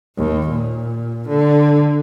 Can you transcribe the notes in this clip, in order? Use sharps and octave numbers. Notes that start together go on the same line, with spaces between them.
D#2
A#2
D3